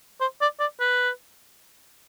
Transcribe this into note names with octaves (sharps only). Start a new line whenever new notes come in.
C5
D5
D5
B4